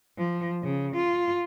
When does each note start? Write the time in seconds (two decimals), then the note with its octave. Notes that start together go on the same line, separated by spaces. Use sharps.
0.18 F3
0.63 C#3
0.96 F4